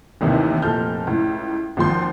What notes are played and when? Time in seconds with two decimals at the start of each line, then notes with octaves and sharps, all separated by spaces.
0.21 A1 D#2 C3 D#3 E3
0.62 F1 A#2 A4 F6 G6
1.07 C#2 A2
1.77 G#1 D#2 F3 C6 G6